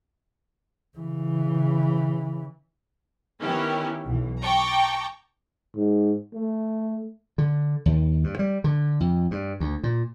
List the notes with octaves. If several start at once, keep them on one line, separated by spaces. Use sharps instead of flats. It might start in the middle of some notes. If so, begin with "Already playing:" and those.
C#3 E3
D#3 B3 C#4 E4 G4 A#4
B1 E3
G5 A5 A#5 C#6 D6
G#2
A3
D3
D#2
G2
G3
D3
F2
G2
D2
A#2